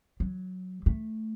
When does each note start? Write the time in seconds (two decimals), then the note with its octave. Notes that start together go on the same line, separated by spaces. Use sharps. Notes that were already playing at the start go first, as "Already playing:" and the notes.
0.20 F#3
0.86 A3